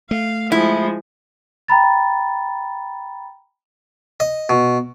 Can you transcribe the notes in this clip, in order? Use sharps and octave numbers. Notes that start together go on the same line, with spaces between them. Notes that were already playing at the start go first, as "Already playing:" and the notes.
A3 F5
F3 G#3 E4
G5 A#5 B5 A6
D#5
B2